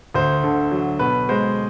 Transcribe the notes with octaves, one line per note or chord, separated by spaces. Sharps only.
D2 C5
D3
F#3
B2 B4
G#3 C5